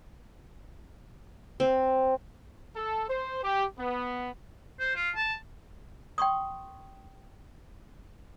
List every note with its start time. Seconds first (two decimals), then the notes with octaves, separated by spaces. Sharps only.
1.60 C4
2.75 A4
3.09 C5
3.44 G4
3.78 B3
4.79 C5
4.95 F4
5.16 A5
6.18 G5 C6 C#6 D#6